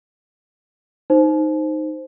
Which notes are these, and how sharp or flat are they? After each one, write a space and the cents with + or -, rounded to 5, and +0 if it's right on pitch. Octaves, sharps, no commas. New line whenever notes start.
D#4 +0 C5 +0